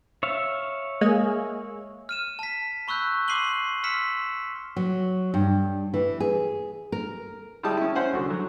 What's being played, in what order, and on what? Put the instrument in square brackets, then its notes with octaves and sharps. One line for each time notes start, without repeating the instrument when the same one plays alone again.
[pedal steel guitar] C#5 E5 F5
[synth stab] G#3 A#3 G#4
[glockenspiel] F6 D#7 E7
A5 B6
B5 C#6 E6 F#6 G6
C6 D6 C7 D#7 F#7 G7
C6 E6 F6 B6 C#7 E7
[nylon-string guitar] F#3
G2
E3
G#4
A#4
[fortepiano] G3 G#3 E4 G5 A5 D#6
C#4 E4
C#4 C5 F#5 G#5
C2 D3 F#4
F#3